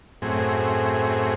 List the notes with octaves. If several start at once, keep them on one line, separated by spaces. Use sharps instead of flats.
F#2 A2 C4 G#4